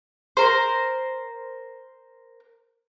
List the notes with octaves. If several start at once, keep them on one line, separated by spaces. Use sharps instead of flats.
A#4 C5